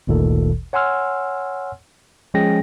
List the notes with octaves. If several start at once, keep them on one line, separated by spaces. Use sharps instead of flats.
G1 D2 A#2 D#3 A4
C#5 F#5 G#5 C6 E6 F6
F3 G#3 C#4 G#4 G5 A#6